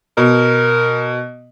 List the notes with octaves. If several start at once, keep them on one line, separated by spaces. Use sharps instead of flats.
B2 A#4